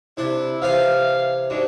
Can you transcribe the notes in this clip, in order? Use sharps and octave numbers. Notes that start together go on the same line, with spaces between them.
C3 D4 E4
C3 E3 F5 G#5
G#2 D4 F#4 G4